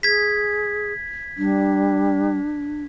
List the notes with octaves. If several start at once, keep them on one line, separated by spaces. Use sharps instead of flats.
G#4 G#6 B6
G3 D4